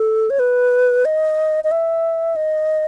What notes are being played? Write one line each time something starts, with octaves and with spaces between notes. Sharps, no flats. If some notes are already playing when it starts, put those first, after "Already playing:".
Already playing: A4
C#5
B4
D#5
D#5
E5
D#5